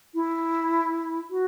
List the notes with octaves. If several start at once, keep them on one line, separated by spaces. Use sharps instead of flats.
E4
F#4